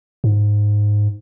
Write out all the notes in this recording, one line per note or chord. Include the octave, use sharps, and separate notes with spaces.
G#2